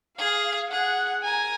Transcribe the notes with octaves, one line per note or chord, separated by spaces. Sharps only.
G#4 F5
G#4 F#5
A#4 G#5